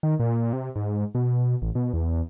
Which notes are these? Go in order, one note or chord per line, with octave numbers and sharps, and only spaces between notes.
D#3
A#2
C3
G#2
B2
A1
B2
E2